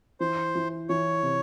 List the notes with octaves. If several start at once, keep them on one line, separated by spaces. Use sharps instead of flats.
E3 C5
E3
E3 C#5
C3